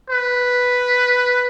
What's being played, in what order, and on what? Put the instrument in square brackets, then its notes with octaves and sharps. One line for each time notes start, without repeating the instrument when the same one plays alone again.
[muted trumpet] B4